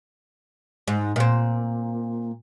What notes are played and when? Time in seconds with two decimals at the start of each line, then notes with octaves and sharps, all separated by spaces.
0.88 G#2
1.16 A#2 C4